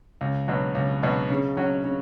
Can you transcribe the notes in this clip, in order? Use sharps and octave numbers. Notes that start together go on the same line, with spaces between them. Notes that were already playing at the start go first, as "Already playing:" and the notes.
C#2
B2 F#3
C#2
B2 F#3
C#3
F#3 C#4 F#4
C#3